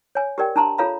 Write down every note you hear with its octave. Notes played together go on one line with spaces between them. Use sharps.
C#5 G#5
G4 A#4 D5 G5
D4 A5 A#5 C6
F4 A4 C#5 F5 A#5 B5